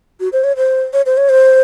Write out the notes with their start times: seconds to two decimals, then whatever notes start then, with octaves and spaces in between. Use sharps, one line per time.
0.20 F#4
0.33 C5
0.44 C#5
0.57 C5
0.93 C#5
1.06 C5
1.17 C#5
1.29 C5